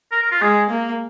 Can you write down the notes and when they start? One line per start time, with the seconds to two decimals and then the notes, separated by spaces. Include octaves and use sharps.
0.12 A#4
0.22 A#4
0.31 F4
0.41 G#3 G#4
0.70 A#3